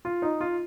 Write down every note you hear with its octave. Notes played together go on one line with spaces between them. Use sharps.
F4
D#4
F4